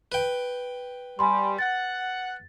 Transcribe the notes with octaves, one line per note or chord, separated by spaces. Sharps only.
B4 G5
G3 G#5 B5 C6
F#5 A6